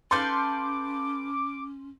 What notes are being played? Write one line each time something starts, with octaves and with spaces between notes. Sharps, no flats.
C#4 A4 B4 F5 C6 D6 G6